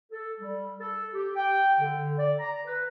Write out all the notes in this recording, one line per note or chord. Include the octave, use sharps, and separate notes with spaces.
A4
G3
A4
G4
G5
D3
D5
A#5
B4